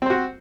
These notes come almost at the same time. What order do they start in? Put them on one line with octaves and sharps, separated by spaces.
C4 C5 F#4